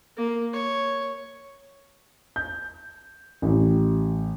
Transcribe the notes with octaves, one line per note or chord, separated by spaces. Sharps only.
A#3
C#5
G6
A1